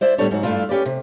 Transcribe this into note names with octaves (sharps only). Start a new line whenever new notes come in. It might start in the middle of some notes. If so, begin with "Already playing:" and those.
E4 C5 D5 E5
A2 G3 B3 D4 A4 C#5
G#2 F#3
G2 A3 B3 D4 E4 F4
C#4 G4 B4 D5
C3